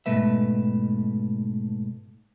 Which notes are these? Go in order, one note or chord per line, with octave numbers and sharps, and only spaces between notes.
G#2 B2 A3 B4 E5